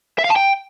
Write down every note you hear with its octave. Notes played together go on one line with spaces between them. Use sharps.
E5
F5
A5
G5